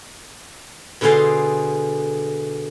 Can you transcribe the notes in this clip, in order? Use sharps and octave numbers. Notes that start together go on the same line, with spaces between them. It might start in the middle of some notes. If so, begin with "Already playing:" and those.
B2 D3 F4 G#4 F5 C6